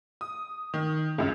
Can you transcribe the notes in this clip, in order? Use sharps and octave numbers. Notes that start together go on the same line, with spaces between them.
D#6
D#3
C#2 F#2